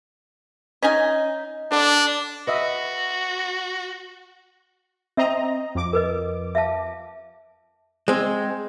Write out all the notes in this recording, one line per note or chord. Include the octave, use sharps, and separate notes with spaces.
C#4 D#4 G#5
D3 D4
F#4 B4 D#5 E5
C4 D#5 E5 A#5
F2 D6
A#4 B4 D#5
E5 F5 A5
G#3 C4